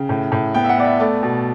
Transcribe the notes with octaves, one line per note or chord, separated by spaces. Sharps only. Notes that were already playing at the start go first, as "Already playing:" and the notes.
Already playing: C#3 G5
A2
A2
B3 G5
E5
F#5
B3 D5
E5
A3 D5
B2